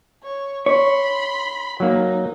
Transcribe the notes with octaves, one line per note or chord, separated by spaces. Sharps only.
C#5
C#5 B5 C6
F#3 A#3 D#4